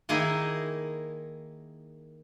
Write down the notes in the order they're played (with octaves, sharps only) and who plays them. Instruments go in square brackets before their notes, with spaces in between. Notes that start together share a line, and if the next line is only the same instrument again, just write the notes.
[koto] D#3 A#3 D#4 E4 G#4